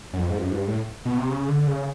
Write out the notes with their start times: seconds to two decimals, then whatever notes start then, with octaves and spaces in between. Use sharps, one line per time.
0.13 F#2
0.19 F2
0.30 G#2
0.39 F2
0.43 F#2
0.51 G#2
0.55 G2
0.68 A2
1.05 B2
1.18 C3
1.30 C#3
1.49 D3
1.67 C#3